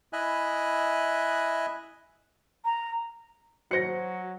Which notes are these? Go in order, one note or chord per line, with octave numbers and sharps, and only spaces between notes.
E4 D#5 E5 G#5 F#6
A#5
F#3 F#4 C5 F#6 A#6 C#7